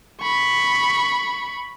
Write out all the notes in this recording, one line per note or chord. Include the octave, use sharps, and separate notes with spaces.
B5 C#6